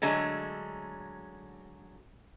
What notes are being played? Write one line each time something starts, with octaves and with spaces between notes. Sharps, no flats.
D3 F#3 G#3 A3